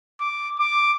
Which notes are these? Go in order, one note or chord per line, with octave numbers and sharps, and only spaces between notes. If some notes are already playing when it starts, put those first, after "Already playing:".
D6
D6